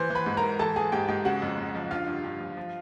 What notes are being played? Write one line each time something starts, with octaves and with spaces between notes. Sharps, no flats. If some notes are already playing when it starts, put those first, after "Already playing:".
Already playing: E3 C5 C6
E3
B4 B5
G#2
A#4 A#5
G#2
E3 A4 A5
E3 G#4 G#5
G#2 G4 G5
G#2 G4 G5
C#3 F#4 F#5
F2
F2
F3
D3 F4 F5
G2
G2
F3
F3